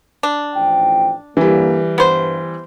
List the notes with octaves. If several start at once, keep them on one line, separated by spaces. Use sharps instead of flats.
D4
A1 F3 G5
G2 D3 E3 G3 A#3
G2 B3 C5